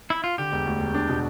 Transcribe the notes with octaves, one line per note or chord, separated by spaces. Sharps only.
E4
F4
D3 G4
E1
D2
E1
D4
B2